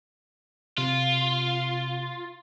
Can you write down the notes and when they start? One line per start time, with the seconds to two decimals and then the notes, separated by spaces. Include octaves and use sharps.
0.78 C3 F4